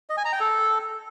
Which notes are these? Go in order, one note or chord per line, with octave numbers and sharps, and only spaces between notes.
D#5
G#5
A#5
G5
A4